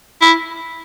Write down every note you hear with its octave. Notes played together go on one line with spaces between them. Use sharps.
E4